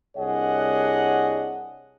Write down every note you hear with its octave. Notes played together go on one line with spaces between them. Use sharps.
C2 D4 G#4 C#5 D#5 F#5